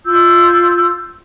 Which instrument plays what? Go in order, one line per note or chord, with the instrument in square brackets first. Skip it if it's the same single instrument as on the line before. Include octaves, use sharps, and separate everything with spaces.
[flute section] F4 E6 G6